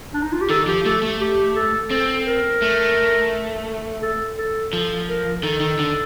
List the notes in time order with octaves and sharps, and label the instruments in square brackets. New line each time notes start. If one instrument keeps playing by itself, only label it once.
[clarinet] D4
D#4
F4
G4
[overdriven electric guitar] D#3 [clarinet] A4
[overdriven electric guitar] F3 [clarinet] G4
[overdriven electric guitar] A3 [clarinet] A4
[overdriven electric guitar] A3
[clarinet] G4
A4
[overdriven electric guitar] C4 [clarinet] A4
[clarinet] A#4
[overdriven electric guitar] A3
[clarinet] A4
A4
[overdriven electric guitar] F3 [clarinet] A4
[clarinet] A#4
[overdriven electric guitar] D#3 [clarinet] A4
[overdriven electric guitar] D#3
D3